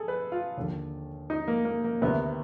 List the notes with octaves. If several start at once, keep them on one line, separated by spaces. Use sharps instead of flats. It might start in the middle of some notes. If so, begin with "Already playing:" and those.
Already playing: G#4 A4
B4
F4
D#2 D3
D#4
A#3
A#3
A#3
D2 C3 D#3 B3